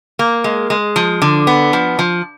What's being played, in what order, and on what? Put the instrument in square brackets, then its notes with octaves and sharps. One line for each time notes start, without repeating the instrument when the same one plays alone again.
[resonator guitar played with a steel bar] A#3
G#3
G#3
F3
D3
B3
F3
F3